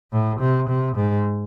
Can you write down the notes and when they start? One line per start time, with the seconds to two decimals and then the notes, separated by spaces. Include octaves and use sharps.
0.12 A2
0.40 C3
0.69 C3
0.96 G#2